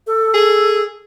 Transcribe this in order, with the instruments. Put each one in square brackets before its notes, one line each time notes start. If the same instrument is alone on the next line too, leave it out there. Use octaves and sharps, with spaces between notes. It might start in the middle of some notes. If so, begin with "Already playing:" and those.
[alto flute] A4
[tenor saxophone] G#4